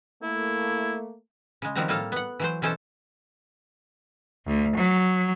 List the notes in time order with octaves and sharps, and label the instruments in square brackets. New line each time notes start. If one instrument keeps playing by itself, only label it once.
[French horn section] A3 A#3 [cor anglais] E4
[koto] C#3 G#3
D#3 F3 G3 C4 F#4 A#5
A2 G3 A#3 A4 F5
B3 F#5
E3 F#3 C5
B2 E3 C#4 A4 C5
[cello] D2
F#3